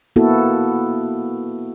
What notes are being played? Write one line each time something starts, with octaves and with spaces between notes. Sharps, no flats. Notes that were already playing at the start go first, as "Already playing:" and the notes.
A#3 B3 E4 F#4 A4